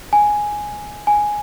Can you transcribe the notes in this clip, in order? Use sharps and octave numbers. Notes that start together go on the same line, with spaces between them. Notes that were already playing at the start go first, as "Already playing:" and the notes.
G#5
G#5